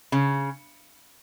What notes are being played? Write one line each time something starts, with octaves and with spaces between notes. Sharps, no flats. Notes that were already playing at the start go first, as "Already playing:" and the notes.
C#3